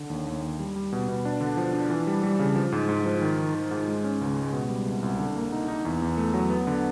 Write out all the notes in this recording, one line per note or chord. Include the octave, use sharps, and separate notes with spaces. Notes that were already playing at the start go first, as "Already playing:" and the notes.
Already playing: D3
D#2
D#2
D#2
G3
G3
B2
B2
D4
D3
F3
D4
E3
G3
G3
C#3
F3
G#2
G#2
F3
D#3
D#3
D#3
G#2
G#3
C#4
C#2
G#3
B2
G3
C2
C2
D3
A#3
D#4
D#4
E2
E2
A3
F#3
B3
D3